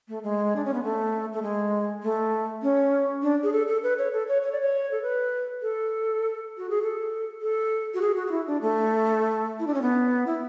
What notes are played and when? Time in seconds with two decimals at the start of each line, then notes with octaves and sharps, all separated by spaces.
0.08 A3
0.23 G#3
0.56 D4
0.65 C#4
0.74 B3
0.84 A3
1.33 A3
1.42 G#3
2.03 A3
2.63 C#4
3.22 D4
3.43 G#4
3.52 A4
3.68 A4
3.83 B4
3.98 C#5
4.13 A4
4.28 C#5
4.43 C#5
4.52 D5
4.60 C#5
4.92 A4
5.02 B4
5.62 A4
6.58 F#4
6.70 G#4
6.83 A4
7.41 A4
7.94 F#4
8.01 G#4
8.16 F#4
8.27 F#4
8.31 E4
8.47 D4
8.62 A3
9.59 E4
9.67 D4
9.74 C#4
9.82 B3
10.27 E4